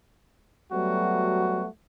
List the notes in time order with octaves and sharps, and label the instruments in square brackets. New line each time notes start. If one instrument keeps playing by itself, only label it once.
[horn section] F#3 G3 A3 B3 F#4